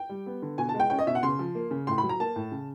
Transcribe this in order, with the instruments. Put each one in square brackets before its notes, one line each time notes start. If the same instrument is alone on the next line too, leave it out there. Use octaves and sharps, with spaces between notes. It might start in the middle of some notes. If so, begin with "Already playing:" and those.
Already playing: [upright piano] G5
G3
B3
D3
B2 G#5
A5
G#3
G5
C#4 G5
D#5
B2 E5
F#5
C#3 C6
F3
A#3
C#3
A2 C6
B5
F#3
A#5
A#3 A5
A2
C#3